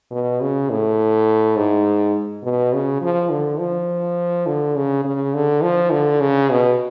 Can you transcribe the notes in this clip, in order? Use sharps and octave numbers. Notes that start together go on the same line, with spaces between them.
B2
C#3
A2
G#2
B2
C#3
F3
D3
F3
D3
C#3
C#3
D3
F3
D3
C#3
B2